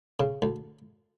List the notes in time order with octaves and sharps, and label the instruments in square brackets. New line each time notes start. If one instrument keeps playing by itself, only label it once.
[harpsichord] C#3
D2